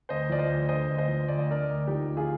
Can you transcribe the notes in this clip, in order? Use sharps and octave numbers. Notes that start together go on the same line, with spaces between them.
D2 C5 D#5
F3 D5
C5 D#5
D2
D3 C5 D#5
D2
C5 D#5
F3
D2 D5
D#5
D3 A#4 D5
D2
F3 D#4 G4
D2
F4 G#4